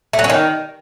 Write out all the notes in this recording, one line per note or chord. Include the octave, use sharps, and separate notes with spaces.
A3
F#3
C#4
D#3